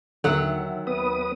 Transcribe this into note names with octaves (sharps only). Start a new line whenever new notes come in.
D#2 D3 F#3 E5 F#5 E6
B3 B4 D#6